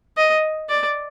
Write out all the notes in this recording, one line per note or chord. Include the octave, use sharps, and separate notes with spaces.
D#5
D5